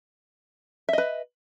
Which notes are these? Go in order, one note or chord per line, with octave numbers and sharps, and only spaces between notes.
B4 D#5 E5